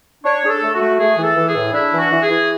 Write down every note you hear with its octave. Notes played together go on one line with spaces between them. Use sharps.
D4 C#5
D4 G#4
A4
A3
F#4
A3
A3 G#4
E3
A4
E3
G#4
A2
D4 E4
E3
F#4
E3
G#4
E3